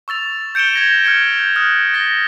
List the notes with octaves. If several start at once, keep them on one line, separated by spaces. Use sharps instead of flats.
C#6 E6 A6 F7
G6 C#7 D7 E7 G7
G#6 A#6 F7
F6 G6 G#6 C#7
D#6 F6 F#6
A6 A#6 G7